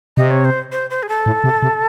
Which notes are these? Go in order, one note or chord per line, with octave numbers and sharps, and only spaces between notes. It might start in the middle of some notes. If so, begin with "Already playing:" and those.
C3 D#5
C#5
C5
C5
C5
G#4
A4
A2
C3
C3